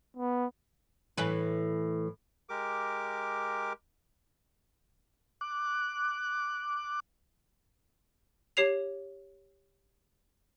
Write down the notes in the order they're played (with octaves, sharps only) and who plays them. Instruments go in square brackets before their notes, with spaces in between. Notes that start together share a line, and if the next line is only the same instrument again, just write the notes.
[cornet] B3
[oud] A2 E3 B4
[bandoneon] G#3 G4 A#4 D6
[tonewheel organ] D6 F#6
[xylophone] G4 C#5 C7 F7